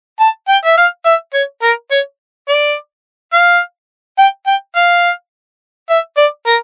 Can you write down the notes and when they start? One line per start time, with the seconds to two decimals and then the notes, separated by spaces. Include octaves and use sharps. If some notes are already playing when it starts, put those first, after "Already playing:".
0.20 A5
0.48 G5
0.65 E5
0.77 F5
1.06 E5
1.34 C#5
1.62 A#4
1.91 C#5
2.49 D5
3.33 F5
4.18 G5
4.47 G5
4.76 F5
5.90 E5
6.17 D5
6.47 A#4